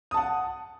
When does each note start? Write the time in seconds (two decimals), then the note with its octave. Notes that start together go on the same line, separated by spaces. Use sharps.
0.11 D#6
0.14 A5
0.17 F#5